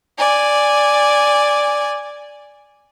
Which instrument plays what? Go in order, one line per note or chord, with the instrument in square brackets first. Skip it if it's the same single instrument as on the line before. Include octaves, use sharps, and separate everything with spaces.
[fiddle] D5 G#5